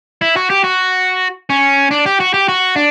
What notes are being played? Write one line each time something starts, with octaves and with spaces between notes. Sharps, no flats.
E4
F#4
G4
F#4
C#4
D4
G4
F#4
G4
F#4
D4